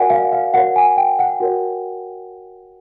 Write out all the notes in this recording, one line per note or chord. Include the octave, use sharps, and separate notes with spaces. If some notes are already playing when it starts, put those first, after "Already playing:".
Already playing: F#4 A#4 D5 F#5 G#5
F5
F5
F#4 A#4 C#5 F#5
G#5
G5
F#5
F#4 A#4 C#5